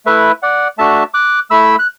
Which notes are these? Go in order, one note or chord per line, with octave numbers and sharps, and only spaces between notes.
A3 E4 B4 E5
D5 F#5
A3 D4 F#4 E5 A5
D6 F#6
A3 E4 B5 E6
F#6